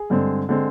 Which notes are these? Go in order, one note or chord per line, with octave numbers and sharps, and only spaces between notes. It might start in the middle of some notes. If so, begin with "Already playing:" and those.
Already playing: G#4
G2 D3 G#3 C4
D3 G#3 C4